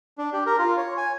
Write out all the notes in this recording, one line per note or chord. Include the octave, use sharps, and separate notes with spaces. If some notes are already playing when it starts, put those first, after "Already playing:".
D4
G4
A#4
F4
C#5
G#5